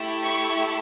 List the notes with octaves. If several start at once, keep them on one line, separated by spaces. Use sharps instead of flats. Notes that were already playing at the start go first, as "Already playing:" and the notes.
Already playing: A3 E4 G4
C#6